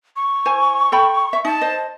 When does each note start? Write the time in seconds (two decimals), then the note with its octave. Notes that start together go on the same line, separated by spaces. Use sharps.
0.16 C#6
0.45 E4 C5 G#5
0.92 A4 G5 B5
1.33 E5
1.45 D#4 A5
1.61 C5 D#5